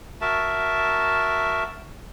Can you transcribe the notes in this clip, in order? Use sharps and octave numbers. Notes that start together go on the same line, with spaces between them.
F#4 A#4 E5 A5